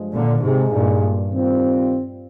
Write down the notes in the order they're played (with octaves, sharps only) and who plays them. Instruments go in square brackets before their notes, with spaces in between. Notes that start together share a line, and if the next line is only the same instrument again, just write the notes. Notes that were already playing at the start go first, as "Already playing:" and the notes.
Already playing: [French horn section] G2 F3 G#3
[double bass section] A#2 D3
[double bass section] G#2 C3 [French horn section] G#3 D#4 G#4
[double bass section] G2 A#2
[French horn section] D#3 G3 C4 F4